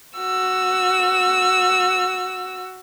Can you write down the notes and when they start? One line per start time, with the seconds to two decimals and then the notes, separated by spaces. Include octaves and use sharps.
0.17 F#4 E6